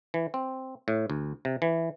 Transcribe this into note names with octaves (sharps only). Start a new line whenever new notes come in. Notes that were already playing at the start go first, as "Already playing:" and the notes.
E3
C4
A2
D2
C3
E3